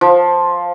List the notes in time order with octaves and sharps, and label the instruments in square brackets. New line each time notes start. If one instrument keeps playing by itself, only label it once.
[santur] F3